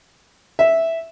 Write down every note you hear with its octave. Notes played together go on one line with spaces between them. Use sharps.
E5